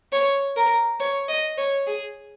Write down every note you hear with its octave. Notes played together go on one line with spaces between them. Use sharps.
C#5
A#4
C#5
D#5
C#5
G#4